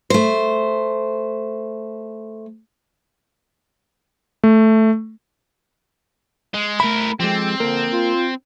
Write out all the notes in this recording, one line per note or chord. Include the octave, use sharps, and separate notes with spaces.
A3 C5
A3
G#3
A3 E4 A#4 B5
F3 G#3 C4 G4 A4
F2 D3 F3 A#3 A#4
F4